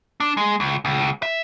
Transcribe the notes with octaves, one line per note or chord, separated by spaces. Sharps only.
D4
G#3
C#2
C#2
E5